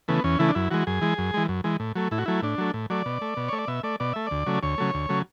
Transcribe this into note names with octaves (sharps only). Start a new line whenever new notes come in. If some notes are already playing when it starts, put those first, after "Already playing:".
C#3 E3 A3 B3
E2 C#4
C#3 E3 A3 E4
D4
F#2 E4
E3 G#3 F#4
F#2 G#4
E3 G#3
F#2
E3 G#3
F#2
E3 G#3
A2
F#3 A3
A2 E4
F#4
F#3 A3 E4
A2 D4
F#3 A3
A2
F#3 A3 D5
B2
A3
B2
A3 C#5
D5
B2 E5
A3 D5
B2 D5
A3 E5
D2 D5
C#3 F#3 A3
D2 C#5
C#3 F#3 A3
D2
C#3 F#3 A3